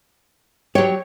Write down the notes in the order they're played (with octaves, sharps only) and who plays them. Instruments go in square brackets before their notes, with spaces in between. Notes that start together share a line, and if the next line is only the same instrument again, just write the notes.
[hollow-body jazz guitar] F#3 G4 [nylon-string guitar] C#5